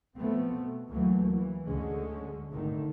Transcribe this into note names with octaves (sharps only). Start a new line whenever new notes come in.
F3 A3 B3 C4
B2
D2 E3 F#3 A3 A#3
E3
D2 D3 G#3 C#4
G#1 D3 D#3 A3